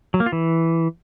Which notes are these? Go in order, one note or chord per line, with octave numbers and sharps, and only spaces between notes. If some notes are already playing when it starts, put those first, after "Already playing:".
F#3
A#3
F4
E3